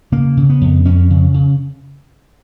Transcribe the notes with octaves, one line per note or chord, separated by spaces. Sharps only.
C#3 A#3
C#3
B3
F2
F2 C#4
C#3
C#3